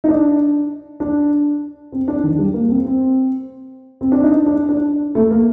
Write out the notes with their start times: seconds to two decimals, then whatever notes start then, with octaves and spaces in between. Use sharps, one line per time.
0.04 D#4
0.08 D4
1.00 D4
1.92 C4
2.08 D4
2.23 D#3
2.39 G3
2.54 A#3
2.69 C4
2.85 C4
4.01 C4
4.12 D4
4.24 D#4
4.46 D4
4.69 D4
5.15 A3
5.31 A#3